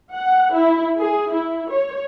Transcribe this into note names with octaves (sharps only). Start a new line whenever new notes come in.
F#5
E4
G#4
E4
C#5